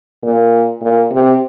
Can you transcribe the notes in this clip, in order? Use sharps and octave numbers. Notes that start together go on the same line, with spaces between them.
A#2
A#2
C3